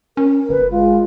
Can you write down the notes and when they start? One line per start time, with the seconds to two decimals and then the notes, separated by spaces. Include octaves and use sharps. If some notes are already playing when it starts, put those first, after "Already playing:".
0.17 C#4 A#4
0.49 G1 B4
0.70 G#3 F4